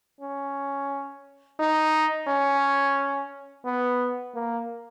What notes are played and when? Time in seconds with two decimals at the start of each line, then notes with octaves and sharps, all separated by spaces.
0.21 C#4
1.60 D#4
2.28 C#4
3.65 B3
4.35 A#3